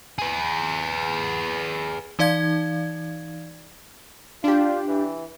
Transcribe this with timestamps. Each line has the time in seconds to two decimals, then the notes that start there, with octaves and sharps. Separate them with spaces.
0.18 G#4 B4
2.19 E3 D#4 D5 F5 G#6
4.44 D4 F4 G4
4.88 E3